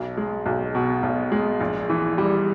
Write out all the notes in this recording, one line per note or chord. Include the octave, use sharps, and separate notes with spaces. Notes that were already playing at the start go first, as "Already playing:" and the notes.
Already playing: B1
G#3
B1
B2
B1
G#3
A#1
E3
G3